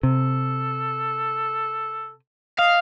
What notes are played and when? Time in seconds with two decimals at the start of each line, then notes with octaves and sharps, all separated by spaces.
0.03 C3 A4
2.59 D#5 F5